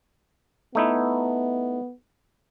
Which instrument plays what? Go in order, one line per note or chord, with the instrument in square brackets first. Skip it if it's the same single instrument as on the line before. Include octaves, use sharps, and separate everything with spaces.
[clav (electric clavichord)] A3 D#4 E4 [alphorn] B3